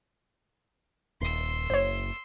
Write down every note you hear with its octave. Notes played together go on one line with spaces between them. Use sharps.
D#1 C6 E6
F#1 C5 C#5